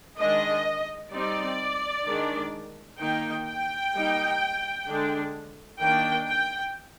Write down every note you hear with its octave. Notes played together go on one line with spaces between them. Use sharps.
D#3 G#3 D4 D#5
G3 C4 D#4 D5
D#3 G#3 D4
D#3 A#3 D#4 G5
G5
G3 A#3 D#4
D3 G#3 D4
D#3 A#3 D4 G5
G5